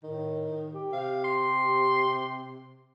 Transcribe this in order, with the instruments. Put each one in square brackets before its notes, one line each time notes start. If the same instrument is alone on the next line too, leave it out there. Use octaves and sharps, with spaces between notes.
[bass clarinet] A2 [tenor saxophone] D#3
[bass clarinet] G4
[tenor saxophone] C3 [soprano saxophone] F5
[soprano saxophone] C6